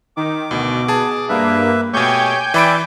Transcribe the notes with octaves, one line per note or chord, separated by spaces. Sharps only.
D#3 D6
D2 B2
G#4 A5
G2 A#3 B4 E5
B2 A3 G4 C#5 G5 G#5 C#6 G6
E3 D5 E5 B5 D7